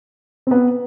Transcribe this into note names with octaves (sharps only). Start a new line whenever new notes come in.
C4
B3